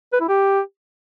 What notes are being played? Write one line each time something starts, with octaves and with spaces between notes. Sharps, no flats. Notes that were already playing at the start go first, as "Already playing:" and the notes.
B4
E4
G4